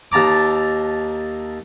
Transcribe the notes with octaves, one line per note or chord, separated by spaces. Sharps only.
D#2 A5 A#5 D6